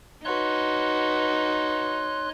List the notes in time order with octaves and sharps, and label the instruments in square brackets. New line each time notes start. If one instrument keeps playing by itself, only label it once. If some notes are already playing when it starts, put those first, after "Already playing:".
[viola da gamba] D#4 [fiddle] F#4 B4 [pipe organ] C#5 C6 F#6